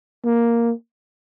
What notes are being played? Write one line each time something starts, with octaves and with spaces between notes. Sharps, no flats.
A#3